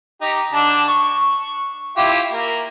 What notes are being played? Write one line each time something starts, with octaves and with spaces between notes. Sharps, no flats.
D#4 G4
D3 D4 A5
C#6
E4 F4 G4
A#3